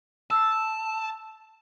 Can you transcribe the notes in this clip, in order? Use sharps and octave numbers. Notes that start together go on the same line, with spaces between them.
A5 E6 C7